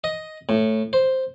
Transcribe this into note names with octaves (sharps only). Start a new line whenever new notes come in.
D#5
A2
C5